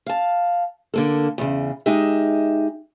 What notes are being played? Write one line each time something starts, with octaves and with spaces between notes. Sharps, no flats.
F5 A5
D3 A#3 A4
E2 C#3
G#3 D#4 G4 D#5 E5